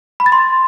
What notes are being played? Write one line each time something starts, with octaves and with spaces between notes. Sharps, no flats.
B5
A6
C6